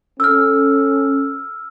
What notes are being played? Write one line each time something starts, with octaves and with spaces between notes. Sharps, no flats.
C#4 A4 E6 F6